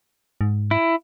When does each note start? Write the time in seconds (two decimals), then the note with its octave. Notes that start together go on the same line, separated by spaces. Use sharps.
0.41 G#2
0.71 E4